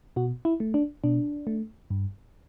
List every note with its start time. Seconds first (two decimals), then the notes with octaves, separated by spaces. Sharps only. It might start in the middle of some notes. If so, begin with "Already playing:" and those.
0.16 B2 F#4
0.45 E4
0.60 A3
0.74 D4
1.04 B2 D4
1.47 A3
1.90 G2